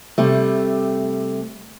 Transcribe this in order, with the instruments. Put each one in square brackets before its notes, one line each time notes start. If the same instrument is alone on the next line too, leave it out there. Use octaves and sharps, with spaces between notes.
[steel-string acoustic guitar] C3 G3 A3